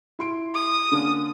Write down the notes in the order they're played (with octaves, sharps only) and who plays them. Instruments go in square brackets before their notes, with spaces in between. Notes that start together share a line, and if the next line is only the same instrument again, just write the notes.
[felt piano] E4 C6 D7
[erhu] D#6
[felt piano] D3 A#3 C#4